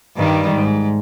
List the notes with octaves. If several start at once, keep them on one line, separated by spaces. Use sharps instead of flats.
G2 D#3 G3
G#2